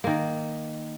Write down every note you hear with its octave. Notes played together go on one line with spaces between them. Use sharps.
D#3 A#3